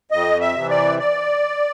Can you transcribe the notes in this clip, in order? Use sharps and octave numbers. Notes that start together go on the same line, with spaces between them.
F2 D#5
E5
C3 E3
D5
D5